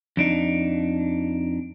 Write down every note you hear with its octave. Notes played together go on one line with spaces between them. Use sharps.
F2 D4 D#4